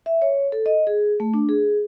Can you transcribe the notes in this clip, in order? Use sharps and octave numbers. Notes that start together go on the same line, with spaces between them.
E5
C#5
A4
D#5
G#4
A3
D4
G#4